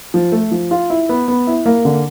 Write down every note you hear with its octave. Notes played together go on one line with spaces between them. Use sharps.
F3
A3
F3
F4
E4
B3
B3
E4
A#3
D3